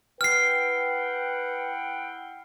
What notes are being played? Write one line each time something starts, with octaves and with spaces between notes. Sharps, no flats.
E4 B4 F#5 G5 F6 C7